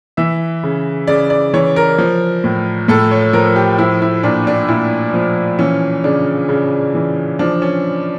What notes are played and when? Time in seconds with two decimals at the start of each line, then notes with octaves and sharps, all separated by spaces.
0.17 E3 E5
0.63 C#3
1.08 C#3 D5
1.30 D5
1.53 E3 C#5
1.76 A#4
1.98 F3
2.44 A2
2.88 A2 A4
3.11 C#5
3.33 F3 A#4
3.56 G4
3.78 F3 E4
4.02 E4
4.23 A#2 D4
4.47 D4
4.68 A#2 E4
5.14 F3
5.59 E3 C#4
6.04 C#3 D4
6.49 C#3
6.94 E3
7.39 F3 D4
7.62 C#4